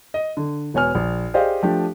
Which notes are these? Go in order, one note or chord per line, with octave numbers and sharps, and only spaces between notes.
D#5
D3
E1 B3 C#5 G#5 F6
A#1
G4 G#4 C5 D5 D#5 F5
F3 A3 D4 G4